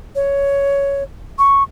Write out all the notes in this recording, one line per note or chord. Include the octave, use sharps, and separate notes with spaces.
C#5
C#6